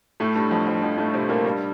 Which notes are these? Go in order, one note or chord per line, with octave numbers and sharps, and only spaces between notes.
A2 A3
G2 G3
F2 F3
F2 F3
F2 F3
A2 A3
C3 C4
A#2 A#3
G2 G3